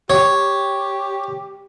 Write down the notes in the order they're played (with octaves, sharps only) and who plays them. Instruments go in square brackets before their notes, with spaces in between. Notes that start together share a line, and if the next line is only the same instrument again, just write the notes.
[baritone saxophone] G4 [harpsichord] C#5